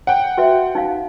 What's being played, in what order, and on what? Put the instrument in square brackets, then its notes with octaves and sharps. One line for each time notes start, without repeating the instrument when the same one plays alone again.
[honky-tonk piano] F#5 G5
[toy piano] F#4 B4 E5
D#4 F5